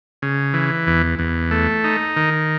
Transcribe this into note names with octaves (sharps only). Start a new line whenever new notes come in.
C#3
E3
E2
E2
A3
D#4
D#3